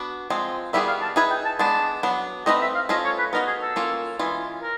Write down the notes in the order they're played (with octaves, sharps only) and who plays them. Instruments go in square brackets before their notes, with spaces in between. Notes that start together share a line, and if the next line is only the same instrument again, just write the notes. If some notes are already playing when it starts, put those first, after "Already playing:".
Already playing: [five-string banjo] B3 D4 F#4
F3 G#3 C4
[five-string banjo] D#3 G3 B3 E4 G#4 [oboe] E5
[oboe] F5
A5
[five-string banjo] D#4 G#4 B4 E5 [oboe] G#5
[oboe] G5
A5
[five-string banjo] G#3 B3 D4 [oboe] A5
[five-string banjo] F#3 B3 D4
[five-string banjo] A3 C4 D#4 F#4 B4 [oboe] D#5
[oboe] E5
F5
[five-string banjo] A3 C#4 F4 A4 C5 [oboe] D#5
[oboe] C#5
B4
[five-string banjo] B3 D#4 F#4 [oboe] A#4
[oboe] G#4
A4
[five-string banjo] A#3 C#4 F4 A#4
E3 G#3 C#4 F4
[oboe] A#4